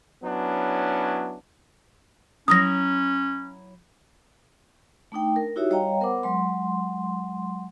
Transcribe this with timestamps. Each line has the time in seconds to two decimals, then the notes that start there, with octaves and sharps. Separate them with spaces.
0.24 F#3 B3 C#4 D4 E4
2.48 F#3 C#4 E4 A#5 D#6 A#6
5.12 A3 D4 D#4 G5
5.36 A#4
5.56 D#4 E4 F#4 G4 C#5 E5
5.70 G3 C#5 D#5 F5 G5 A#5
6.00 B3 A#4 C5 F#5 D6
6.23 F#3 G#3 C6